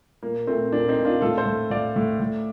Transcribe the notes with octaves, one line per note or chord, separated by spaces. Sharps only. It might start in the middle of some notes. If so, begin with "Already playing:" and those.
A#2 A#3
A#2 A3 C4
A#2 A#3 D4
C4 D#4
A#2
D4 F4
A2 F4 A4
A4 C5
A2
A2 D5 F5
A2
A2